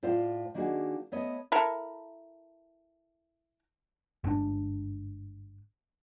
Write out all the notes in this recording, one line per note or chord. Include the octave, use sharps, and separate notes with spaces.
A2 F4 C5 D5 F5
D#3 A#3 D4 F4 F#4 G#4
A3 B3 C#5 D#5
E4 A4 A#4
G1 G#2 D4